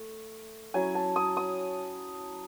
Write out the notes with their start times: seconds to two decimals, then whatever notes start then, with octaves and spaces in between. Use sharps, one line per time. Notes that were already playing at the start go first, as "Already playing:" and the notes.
Already playing: A3
0.74 F#3 C#4 E4 G#5
0.95 A5
1.16 D#6
1.37 D#6